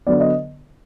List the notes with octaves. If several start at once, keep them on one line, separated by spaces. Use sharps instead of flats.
D3 F#3 B3 D5
D#5